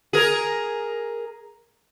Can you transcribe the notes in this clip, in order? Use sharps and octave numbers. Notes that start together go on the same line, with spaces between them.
G#4 A#4